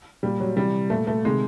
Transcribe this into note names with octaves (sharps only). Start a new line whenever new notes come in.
A#2 G3
F#3
C3 E3 G3
A#2 A3
A3
C3 D#3 G#3